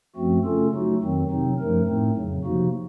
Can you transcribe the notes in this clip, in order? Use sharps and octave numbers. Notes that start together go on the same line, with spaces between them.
F#2 F3 A3 C4 F#4
C#3 A3 C#4 F4 A4
F#3 A3 D#4 F#4
F2 D#3 F#3 C4
C3 F#3 C4 D#4
F#2 F3 A3 D#4 A#4
A2 A3 C4 D#4
F2 C#3 F#3
C3 F3 A#3 D#4 F#4